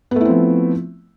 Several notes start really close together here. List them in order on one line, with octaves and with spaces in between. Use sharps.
B3 A3 E4 C4 F3